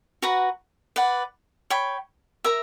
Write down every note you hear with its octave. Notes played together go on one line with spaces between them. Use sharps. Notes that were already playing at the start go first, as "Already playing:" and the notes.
F#4 B4 F#5 A#5
B4 D5 F#5
C#5 G5 B5
A#4 E5 A#5